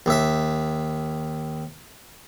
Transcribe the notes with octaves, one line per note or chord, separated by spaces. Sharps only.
D#2 E5